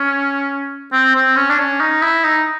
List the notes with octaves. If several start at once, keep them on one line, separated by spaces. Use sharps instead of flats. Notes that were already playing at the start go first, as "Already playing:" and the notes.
Already playing: C#4
C4
C4
C#4
D4
C#4
D#4
E4
D#4